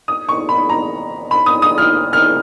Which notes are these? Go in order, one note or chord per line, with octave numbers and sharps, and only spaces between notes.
D#6
C#6
B5
A#5
B5
D#6
D#6
F6
F6